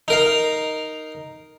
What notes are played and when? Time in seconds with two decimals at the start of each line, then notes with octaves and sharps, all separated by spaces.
0.08 D#4 A#4 F5